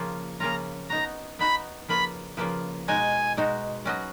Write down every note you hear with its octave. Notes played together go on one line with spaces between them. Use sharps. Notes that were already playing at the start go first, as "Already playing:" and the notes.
Already playing: C#3 F3 A#3 C#4 F4
C#3 F3 A#3 C#4 F4 A#5
B3 D#4 F#4 A#5
B3 D#4 F#4 B5
C#3 F3 A#3 F4 B4 B5
C#3 F3 A#3 F4 B4
B2 G#3 D#4 F#4 G#5
B2 G#3 D#4 F#4
F#3 C#4 F#4 B4 D#5